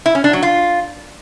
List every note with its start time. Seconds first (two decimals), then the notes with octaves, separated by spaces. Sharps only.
0.06 E4
0.15 C#4
0.24 D4
0.33 F#3
0.42 F4